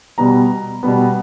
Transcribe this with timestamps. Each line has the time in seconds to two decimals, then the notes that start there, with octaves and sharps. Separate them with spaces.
0.18 B2 G3 B3 A#5
0.83 B2 G3 B3